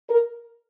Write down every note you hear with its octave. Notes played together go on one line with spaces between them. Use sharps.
A#4